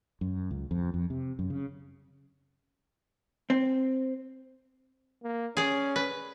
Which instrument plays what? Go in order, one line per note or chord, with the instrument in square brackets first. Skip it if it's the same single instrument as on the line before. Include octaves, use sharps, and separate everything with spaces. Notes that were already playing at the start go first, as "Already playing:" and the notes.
[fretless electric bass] F#2
C#2
F2
F2
C3
F#2
C#3
[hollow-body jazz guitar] C4
[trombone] A#3
[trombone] C#4 [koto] G#4 D5
[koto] B4